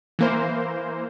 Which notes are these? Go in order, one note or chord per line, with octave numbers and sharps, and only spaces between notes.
E3 A#3 C5